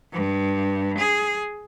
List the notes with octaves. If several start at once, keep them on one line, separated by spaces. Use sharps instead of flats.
G2
G#4